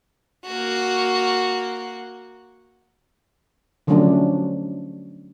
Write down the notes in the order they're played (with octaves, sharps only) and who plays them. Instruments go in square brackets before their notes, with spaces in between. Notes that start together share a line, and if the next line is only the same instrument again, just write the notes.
[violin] A#3 F#4
[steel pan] D3 F3 F#3 A3 C#4 D4